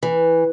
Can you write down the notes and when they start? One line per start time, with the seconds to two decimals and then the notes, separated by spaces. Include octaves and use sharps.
0.03 E3